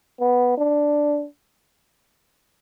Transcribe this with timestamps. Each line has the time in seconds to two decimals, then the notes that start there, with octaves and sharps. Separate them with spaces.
0.20 B3
0.58 D4